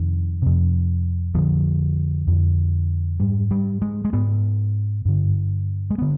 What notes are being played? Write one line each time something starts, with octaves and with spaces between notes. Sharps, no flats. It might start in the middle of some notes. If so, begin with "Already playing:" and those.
Already playing: F2 C3 D#3
F2 C3
F2 D3 F3
F2 D3
G#2 G3
G3
G#3
G#3
G#2 B3
G2 D3
G#3
D3 B3